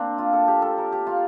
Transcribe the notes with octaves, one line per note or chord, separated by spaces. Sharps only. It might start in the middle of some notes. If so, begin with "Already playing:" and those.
Already playing: A#3 C4 D4
F4
A4
G4
A4
A#4
G4
F4